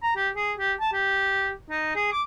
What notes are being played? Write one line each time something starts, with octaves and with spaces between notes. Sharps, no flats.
A#5
G4
G#4
G4
A5
G4
D#4
G#4
D6